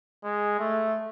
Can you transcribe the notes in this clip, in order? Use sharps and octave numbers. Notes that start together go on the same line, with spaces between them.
G#3
A3